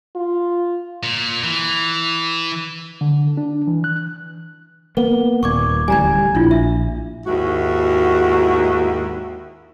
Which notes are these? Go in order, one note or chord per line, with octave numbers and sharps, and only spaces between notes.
F4
A#2
E3
D3
D4
E3
F#6
A#3 B3 G7
D#1 A#2 C#6 D6 G#6
D1 A1 G3 G#5 A#5 G#6
A#1 D4 E4 F4
E5
D#2 G#2 E4 F#4